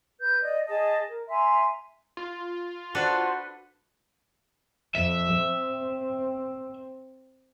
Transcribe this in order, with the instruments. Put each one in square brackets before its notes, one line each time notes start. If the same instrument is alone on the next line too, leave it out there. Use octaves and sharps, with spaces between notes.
[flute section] B4 G6
D5 D#5
G#4 D#5 A5
A#4
E5 G#5 A#5 C6
[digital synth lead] F4
[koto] D4 A4 B4 [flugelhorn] F#4 [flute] C5
[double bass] F2 [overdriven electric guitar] E5
[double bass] C4